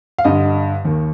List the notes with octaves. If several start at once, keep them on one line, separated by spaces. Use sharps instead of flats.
F5
G2 D3 D#5
D#2 D#3